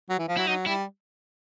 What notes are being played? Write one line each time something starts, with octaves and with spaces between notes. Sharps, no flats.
F#3
E3
F3
F#3 E4
F#3 D#4
G3 E4